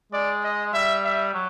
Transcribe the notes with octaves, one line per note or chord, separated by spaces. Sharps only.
G#3 D5
D#5
G3 E5
E5
F#3